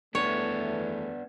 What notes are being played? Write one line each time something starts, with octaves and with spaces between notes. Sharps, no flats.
E2 E3 A3 B3 D4 C#5